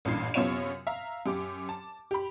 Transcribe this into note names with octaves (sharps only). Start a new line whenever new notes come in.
A1 G2 A#2 C7
F#2 C3 B3 F4 C#5 E7
E5 F5 A#5
F#2 G4 D6
A5
G4 B5